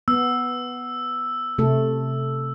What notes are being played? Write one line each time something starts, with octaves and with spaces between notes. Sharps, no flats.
B3 E6
C3 A3 A4